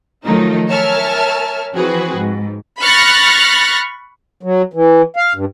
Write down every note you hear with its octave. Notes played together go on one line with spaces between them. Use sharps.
D#3 F3 F#3 A3 D#4 F4
A#4 C#5 E5 G#5 A5 F6
E3 F3 C4 F#4 G#4 B4
G#2
B5 C#6 F6 F#6 A6 A#6
F#3
E3
F5
G2